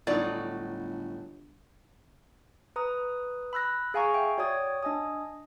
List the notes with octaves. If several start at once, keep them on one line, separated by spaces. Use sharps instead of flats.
G1 A2 F#3 D#4 D5
B4 A#5 D#6
B5 E6 F#6 A#6
G#4 F5 G#5 A#5 C#6
E5 G5
F#4 C#5 D5 G5 D#6 G#6
D4 D#5 G#5 D#6